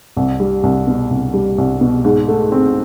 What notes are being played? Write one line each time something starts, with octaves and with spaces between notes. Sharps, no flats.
C2
G3
C2
B2
C2
G3
C2
B2
G#2
A3
C4